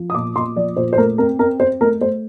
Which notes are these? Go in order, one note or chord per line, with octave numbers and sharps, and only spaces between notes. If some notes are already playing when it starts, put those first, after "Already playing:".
Already playing: F3
D#6
A#2 D6
A#2 C6
F3 D5
A#2 C5
C5
A3 A#4
C4 A#4
C4 A#4
C4 C5
A3 A#4
A3 C5